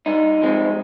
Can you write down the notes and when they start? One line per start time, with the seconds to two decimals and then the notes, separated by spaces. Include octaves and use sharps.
0.06 G2 D#4
0.42 F3 G#3 C4